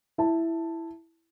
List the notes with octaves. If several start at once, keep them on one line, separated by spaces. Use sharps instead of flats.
E4 A5